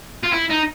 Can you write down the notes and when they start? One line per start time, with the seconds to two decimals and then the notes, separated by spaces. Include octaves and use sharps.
0.24 F4
0.33 E4
0.50 D#4